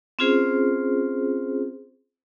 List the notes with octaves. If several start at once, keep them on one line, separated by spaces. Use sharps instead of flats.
C4 C#4 F4 G#4 C5